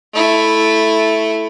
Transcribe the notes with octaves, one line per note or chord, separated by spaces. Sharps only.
A3 E4